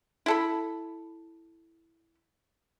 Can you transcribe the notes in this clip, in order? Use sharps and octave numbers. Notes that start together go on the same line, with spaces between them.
E4 A4 B5